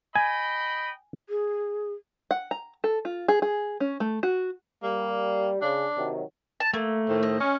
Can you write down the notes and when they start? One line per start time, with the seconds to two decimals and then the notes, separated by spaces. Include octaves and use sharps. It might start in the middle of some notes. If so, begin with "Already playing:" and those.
0.16 D#5 G5 G#5 B5
1.29 G#4
2.31 F#5
2.51 A#5
2.84 A4
3.05 F4
3.28 G#4
3.42 G#4
3.80 C#4
4.00 A3
4.23 F#4
4.83 G3 A#3
5.62 C#3 D4
5.96 C3 D#3 F#3
6.60 A5
6.73 A3 A#3
7.08 A2 D#3 C5
7.23 D#5
7.41 C#4